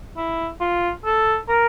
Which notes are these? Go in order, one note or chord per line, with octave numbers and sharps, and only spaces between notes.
E4
F4
A4
A#4